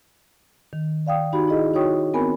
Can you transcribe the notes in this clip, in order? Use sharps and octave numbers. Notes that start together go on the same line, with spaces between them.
D#3
D5 F5 G5 D#6
D#4 F#4 G4 B5
E4 G#4 D#5
D#4 F#4 C#5 G5 C#6 D#6
B3 C4 A#4 G#5 B5